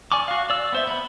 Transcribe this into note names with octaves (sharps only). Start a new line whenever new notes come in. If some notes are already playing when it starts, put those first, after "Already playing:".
D5 G#5 C#6 D6
F#4 F5
D5 E6
B3 C5 E5
B3 B5